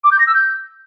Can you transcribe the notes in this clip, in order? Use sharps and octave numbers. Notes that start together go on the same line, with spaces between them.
D6
G6
A#6
E6
G6